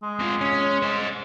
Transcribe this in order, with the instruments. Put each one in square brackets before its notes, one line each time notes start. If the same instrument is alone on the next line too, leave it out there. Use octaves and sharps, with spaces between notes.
[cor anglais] G#3
[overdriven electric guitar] C3 F4
C#4
C5 D#5